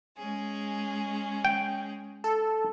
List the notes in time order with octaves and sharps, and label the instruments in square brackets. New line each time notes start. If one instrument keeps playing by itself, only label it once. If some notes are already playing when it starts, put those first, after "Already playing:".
[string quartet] G#3 C#4 G#4
[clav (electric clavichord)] G5
[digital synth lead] A4